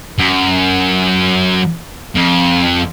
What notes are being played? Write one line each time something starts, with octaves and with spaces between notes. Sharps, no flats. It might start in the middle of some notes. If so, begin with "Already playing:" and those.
F#2
F2